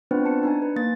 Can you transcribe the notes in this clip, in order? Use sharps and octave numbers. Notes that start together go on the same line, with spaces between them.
B3 C4 D4 F4 B4 C5
A5 C#7
D4 D#4 G#5
B4
A#3 A6